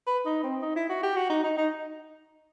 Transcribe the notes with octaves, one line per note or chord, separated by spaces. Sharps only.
B4
D#4
C4
D#4
E4
F#4
G4
F#4
D#4
D#4
D#4